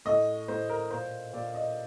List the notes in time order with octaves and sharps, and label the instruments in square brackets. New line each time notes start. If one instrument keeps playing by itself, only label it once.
[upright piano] A2 D#5
A2 C5
A#4
A#2 C5
A#2 D5
D#5